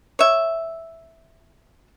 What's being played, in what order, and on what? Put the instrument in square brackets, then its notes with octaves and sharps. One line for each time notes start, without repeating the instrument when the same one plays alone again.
[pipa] C#5 E5